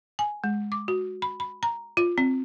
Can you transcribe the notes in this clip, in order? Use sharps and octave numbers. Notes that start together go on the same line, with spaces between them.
G#5
G#3
D6
F#4
B5
B5
A#5
F4
C4